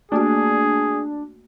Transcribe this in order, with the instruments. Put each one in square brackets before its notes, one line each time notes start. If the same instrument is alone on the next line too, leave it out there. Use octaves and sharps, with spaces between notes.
[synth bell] A3 A#3 F#4 [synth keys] D4 [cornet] G#4